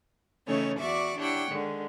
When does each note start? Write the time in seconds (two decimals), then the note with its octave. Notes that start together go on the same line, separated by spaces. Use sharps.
0.46 C#3 E3 A3 C#4 D#4 C#5
0.78 E2 F#4 D5 E5 C#6 D6
1.17 D4 E4 G4 C#5 F#5 G5
1.49 D3 D#3 G#3